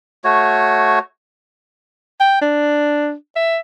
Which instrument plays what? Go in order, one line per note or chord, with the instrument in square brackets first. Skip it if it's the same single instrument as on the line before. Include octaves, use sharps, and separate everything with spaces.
[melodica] A3 F#4 C#5
[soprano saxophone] G5
D4
E5